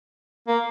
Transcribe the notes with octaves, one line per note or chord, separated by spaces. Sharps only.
A#3